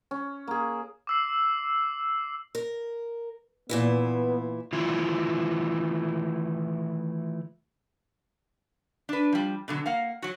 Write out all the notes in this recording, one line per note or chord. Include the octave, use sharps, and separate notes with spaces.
C#4
A#3 G#4
D6 E6 C7
A#4
A#2 E3 B3 E4
D#3 E3 A3 E4 F4
D4 B4
F3 G3
B2 D3 F#3
A#3 F5 F#5
F#3 F#4